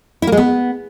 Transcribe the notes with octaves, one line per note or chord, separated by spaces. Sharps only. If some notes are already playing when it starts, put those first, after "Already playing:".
E4
A#3
G#3
B3